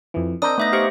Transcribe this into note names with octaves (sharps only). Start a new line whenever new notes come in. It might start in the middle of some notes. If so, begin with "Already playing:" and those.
F2 E3
C4 D4 A#4 D#5 D#6 G6
A3 B3 D#4 E5 A#6
G4 C5 F5 C#6